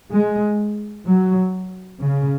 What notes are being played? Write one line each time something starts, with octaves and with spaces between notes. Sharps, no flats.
G#3
F#3
C#3